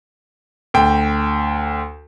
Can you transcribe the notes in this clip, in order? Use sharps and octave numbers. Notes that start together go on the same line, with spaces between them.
D2 G5